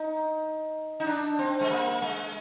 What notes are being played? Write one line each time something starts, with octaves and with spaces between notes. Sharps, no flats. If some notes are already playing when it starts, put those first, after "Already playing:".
Already playing: D#4
D#4
D4
C4
G#3
A#3
G#3